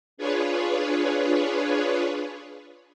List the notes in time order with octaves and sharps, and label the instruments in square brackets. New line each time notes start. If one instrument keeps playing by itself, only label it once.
[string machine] D4 F4 G#4 B4 C#5